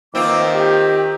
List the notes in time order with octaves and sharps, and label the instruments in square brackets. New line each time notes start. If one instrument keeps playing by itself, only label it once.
[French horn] D#3 [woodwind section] E3 A#3 D6 [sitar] C4 F4
[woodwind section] G4